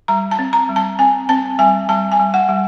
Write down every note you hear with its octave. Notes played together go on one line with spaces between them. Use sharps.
G3 A#5
A5
C4
A#5
G3
A5
C4 G#5
C4 A5
G3 G#5
G3 A5
G#5
G3
F#5
G3